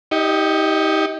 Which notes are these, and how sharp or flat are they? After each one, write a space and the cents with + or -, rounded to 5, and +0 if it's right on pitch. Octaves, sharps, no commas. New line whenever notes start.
D#4 +35 G4 +0 D#5 -30